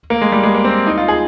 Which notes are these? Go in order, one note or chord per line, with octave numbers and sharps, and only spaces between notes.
A#3
G#3
G3
G#3
A#3
C4
D#4
F4
G#4